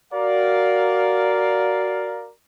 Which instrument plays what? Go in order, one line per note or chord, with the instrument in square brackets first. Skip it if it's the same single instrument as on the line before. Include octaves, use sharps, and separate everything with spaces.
[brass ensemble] F#4 A#4 D5 F5